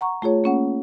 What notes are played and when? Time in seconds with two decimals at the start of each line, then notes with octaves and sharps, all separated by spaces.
0.01 F#5 A#5 C#6
0.22 A3 F4 G#4 C#5
0.44 A#3 C#4 F#5